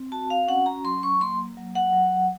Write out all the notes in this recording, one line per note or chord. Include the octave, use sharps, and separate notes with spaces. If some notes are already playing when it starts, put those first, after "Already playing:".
Already playing: C4
F#4 A5
F5
C#4 F#5
A#5
F#3 C6
C#6
A#3 C6
F#3
F#5
F#3